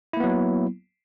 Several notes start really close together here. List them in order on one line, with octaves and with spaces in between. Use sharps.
E4 A#3 B3 F#3